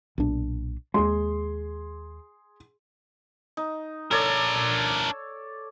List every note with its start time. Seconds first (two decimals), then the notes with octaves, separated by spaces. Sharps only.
0.18 B1 A#2 D4
0.94 D#2 G#3 G#4 C6
3.57 D#4
4.11 D4 A4 A#4 C#5 D5